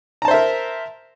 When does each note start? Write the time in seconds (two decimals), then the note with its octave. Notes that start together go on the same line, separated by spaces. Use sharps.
0.22 A#5
0.25 A5
0.28 C5
0.31 E5
0.34 A#4